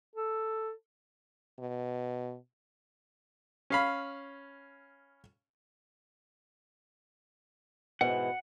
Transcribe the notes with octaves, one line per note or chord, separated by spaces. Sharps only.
A4
B2
C#4 F5 B5
G#2 B2 E3 F#5